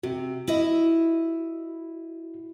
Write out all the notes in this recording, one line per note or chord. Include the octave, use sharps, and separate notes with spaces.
C3 F#4
E4 D#5